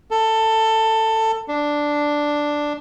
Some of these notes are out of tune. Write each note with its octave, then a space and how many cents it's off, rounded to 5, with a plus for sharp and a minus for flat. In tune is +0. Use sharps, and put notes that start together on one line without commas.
A4 +15
D4 +0